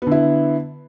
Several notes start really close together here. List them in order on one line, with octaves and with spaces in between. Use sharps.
B3 D3 E4